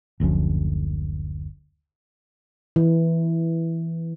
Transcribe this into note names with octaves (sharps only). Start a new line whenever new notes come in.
F#1 D2 F3 C#4
E3